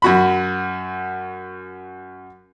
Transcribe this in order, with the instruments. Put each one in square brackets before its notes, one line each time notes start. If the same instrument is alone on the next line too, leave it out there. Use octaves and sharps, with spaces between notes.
[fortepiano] F#2 F#4 B5